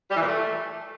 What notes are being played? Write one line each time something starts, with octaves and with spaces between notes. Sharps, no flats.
G3
E3
A#2
A3